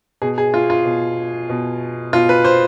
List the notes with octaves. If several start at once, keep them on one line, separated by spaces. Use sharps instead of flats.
B2 G#4
G#4
F4
F4
B2
B2
B2 F4
B4
C5